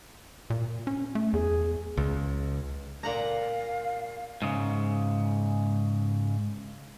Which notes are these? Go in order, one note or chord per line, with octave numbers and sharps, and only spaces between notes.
A#2
C#4
A3
E2 G#4
C#2
A#2 F5 F#5 A#5
G#2 C#3